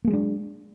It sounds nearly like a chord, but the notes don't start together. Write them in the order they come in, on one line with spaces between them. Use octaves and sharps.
A#3 G#3 F#3 D4